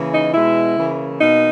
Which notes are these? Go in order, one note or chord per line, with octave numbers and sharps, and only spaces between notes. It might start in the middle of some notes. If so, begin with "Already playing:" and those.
Already playing: C#3 E3 A#3
D#4
B2 G#3 B3 E4
C#3 E3 A#3
B2 A#3 D#4